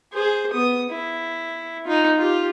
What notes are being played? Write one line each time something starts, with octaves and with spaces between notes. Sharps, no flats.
G#4 C5
B3 D#6
E4
D#4 F4
F4 G4